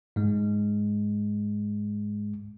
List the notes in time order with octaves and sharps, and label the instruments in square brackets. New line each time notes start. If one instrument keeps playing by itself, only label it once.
[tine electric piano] G#2 G#3